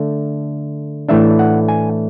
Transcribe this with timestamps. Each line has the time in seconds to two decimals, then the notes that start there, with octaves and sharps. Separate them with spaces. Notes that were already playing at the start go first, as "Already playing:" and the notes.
Already playing: D3 A3
1.09 A2 E3 A3 D4 E5
1.39 F#5
1.68 G#5